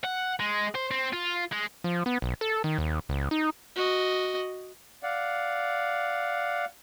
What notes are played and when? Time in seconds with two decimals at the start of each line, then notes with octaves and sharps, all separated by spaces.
0.04 F#5
0.40 G#3
0.75 C5
0.91 C4
1.13 F4
1.52 G#3
1.84 F3
2.06 B3
2.22 B1
2.41 A4
2.64 D#3
2.78 D#2
3.09 C#2
3.31 D#4
3.76 F#4 D#5
5.03 D5 F5 F#5